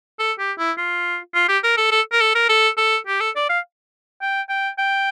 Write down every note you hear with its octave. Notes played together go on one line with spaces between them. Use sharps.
A4
G4
E4
F4
F4
G4
A#4
A4
A4
A#4
A4
A#4
A4
A4
G4
A4
D5
F5
G5
G5
G5